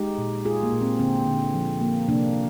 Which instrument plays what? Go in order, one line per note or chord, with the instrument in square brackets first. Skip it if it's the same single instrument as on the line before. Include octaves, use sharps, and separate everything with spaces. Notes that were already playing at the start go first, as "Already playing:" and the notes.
Already playing: [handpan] G#3 D#4 G4
A#2
G#3 F4 G#4
A#3
A#2
C4
D3 C4
D3
F3
A#3
C3 A#3 D4